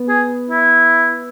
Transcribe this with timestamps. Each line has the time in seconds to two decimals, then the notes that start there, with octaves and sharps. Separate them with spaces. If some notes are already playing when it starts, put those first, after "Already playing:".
Already playing: B3
0.09 G#4
0.50 E4